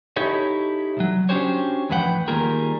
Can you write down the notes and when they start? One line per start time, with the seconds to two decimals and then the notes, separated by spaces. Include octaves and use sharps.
0.16 D#4 E4 G4 A4 C#5
0.97 C2 F#3
1.29 C#4 D4 F#4 G4 C5 C#5
1.89 E2 A2 F3 B4 F#5 G5
2.28 D#3 G3 A#3 F4 G#4 A#4